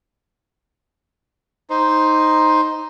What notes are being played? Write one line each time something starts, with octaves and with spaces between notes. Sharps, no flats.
D#4 C5